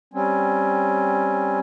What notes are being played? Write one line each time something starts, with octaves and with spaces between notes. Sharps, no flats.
G3 C4 C#4